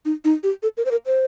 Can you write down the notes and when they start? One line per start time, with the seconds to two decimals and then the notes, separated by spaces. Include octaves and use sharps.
0.05 D#4
0.25 D#4
0.43 G4
0.63 A4
0.77 A#4
0.86 C5
0.91 A#4
1.06 C5